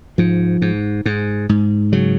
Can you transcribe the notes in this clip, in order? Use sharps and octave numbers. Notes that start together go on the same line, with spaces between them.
G#2 F3
G#2
G#2
G#2
C#3 F#3